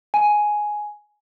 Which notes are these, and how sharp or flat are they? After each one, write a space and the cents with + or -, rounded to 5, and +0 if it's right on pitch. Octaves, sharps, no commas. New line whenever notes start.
G#5 +10